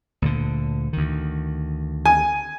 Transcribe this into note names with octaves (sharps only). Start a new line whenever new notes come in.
D2 A#2 D3
D2 D#3
G#5